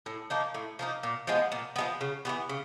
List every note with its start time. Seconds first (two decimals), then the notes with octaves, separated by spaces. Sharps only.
0.06 A2
0.30 F3 A#3 D#4
0.54 A2
0.79 F3 A#3 D#4
1.03 A#2
1.27 F3 G#3 B3
1.52 A#2
1.76 F3 G#3 B3
2.01 C#3
2.25 G3 B3
2.29 E3
2.49 C#3